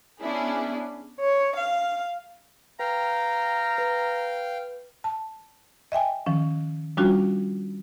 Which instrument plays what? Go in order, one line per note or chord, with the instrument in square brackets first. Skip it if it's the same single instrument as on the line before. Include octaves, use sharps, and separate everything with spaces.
[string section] B3 C#4 D4 E4 G#4
[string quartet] C#5
F5
[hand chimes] B4 [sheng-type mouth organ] F5 G5 [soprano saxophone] A#5
[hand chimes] B4
[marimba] A5
D#5 E5 G5 G#5
D#3 F3 C#4
F3 G3 C#4 D4 F4 F#4